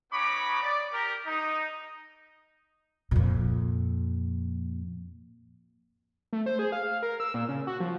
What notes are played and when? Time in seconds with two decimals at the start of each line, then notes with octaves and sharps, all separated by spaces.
0.12 B3 C#4 D#4 B5 C#6 D6
0.62 D5
0.92 G4 A#4
1.27 D#4
3.11 F2 A#2
6.33 A3
6.46 C5
6.59 G#4
6.72 F5
7.03 A#4
7.20 E6
7.34 A#2
7.49 C#3
7.67 F#4
7.80 F3